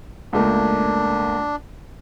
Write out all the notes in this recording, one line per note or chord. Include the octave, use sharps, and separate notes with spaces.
C#2 A3 A#3 D4